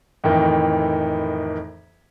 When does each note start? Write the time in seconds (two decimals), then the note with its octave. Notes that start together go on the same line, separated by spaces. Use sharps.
0.24 F2 A2 D#3 E3